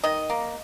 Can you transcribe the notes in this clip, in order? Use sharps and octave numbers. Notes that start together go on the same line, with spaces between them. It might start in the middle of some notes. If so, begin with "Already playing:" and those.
D#3 D#5
A#3